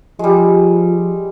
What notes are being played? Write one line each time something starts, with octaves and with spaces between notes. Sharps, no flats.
F3 G3 G#3